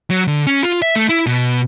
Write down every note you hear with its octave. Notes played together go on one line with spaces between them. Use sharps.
F#3
D3
C#4
F4
E5
A3
E4
B2